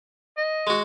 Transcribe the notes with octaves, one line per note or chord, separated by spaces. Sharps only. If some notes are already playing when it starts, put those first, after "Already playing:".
D#5
G#3 F#4